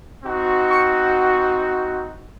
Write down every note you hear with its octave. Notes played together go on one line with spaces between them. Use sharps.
C4 D#4 F#4
C#6